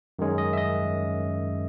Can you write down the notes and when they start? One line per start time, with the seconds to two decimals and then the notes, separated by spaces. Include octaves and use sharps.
0.19 F#2 D#3 G#3 C#4
0.38 D#5
0.53 E5
0.58 D#5